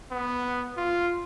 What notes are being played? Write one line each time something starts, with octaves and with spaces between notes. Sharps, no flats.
B3
F4